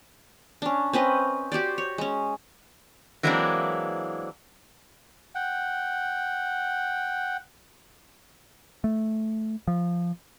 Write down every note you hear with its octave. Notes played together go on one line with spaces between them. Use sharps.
C#4 D4
C4 C#4 B4 D#5
F#4 G4 C5 D5
C#5
G#3 C#4
E3 F#3 G#3 A#3 C4 D4
F#5 G5
A3
F3